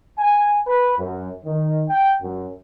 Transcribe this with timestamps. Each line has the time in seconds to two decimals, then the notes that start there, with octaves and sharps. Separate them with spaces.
0.18 G#5
0.67 B4
0.98 F#2
1.44 D#3
1.88 G5
2.21 F#2